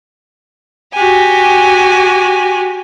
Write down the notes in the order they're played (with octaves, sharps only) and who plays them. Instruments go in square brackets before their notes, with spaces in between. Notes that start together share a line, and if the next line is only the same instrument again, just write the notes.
[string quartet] F#4 G4 G#5